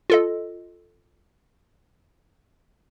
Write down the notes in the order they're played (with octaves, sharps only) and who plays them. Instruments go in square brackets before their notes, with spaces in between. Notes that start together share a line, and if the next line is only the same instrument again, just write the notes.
[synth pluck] F4 A4 D#5